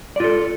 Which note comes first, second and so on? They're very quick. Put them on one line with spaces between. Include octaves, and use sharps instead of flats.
D5 F4 A4